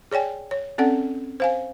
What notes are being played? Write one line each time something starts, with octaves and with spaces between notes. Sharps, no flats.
G#4 C#5 D5 G5 G#5
C#5
C4 C#4 A4 D5 F#5
C5 F5 G#5